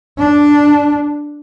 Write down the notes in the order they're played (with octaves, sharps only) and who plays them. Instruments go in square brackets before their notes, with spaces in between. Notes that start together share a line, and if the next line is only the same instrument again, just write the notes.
[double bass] D4